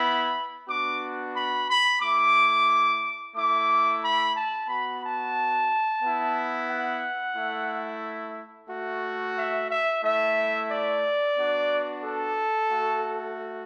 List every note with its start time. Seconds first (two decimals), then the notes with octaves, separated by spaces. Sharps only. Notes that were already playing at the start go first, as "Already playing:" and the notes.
Already playing: B3 E4 B5
0.68 B3 D4 F#4 D6
1.34 B5
1.68 B5
2.01 A3 E4 D6
3.35 A3 E4 D6
4.03 B5
4.36 A5
4.69 B3 F#4 B5
5.02 A5
6.02 B3 E4
6.69 F#5
7.36 A3 E4
8.69 A3 F#4
9.36 E5
9.69 E5
10.02 A3 E4 E5
10.69 D5
11.37 B3 D4 F#4
12.03 A4
12.70 A3 F#4